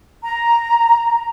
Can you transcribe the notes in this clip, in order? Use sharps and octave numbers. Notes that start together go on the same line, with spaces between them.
A#5